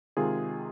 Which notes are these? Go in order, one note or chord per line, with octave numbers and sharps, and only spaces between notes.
C3 D#3 G#3 F4 G#4